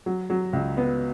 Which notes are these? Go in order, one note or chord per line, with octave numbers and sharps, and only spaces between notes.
F#3
F#3
C#2
B3